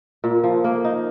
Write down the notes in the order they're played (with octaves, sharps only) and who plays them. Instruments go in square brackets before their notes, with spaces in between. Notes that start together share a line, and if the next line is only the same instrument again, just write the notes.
[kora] A#2
F3
A#3
D#4